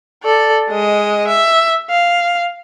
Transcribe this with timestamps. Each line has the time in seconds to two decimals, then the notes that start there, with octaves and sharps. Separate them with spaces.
0.23 A4 D5
0.70 G#3 D#5
1.28 E5
1.90 F5